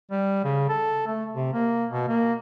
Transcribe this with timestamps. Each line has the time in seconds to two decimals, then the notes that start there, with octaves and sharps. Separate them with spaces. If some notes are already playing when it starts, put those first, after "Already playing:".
0.11 G3
0.44 C#3
0.69 A4
1.07 A3
1.33 C3
1.53 A#3
1.90 B2
2.08 A#3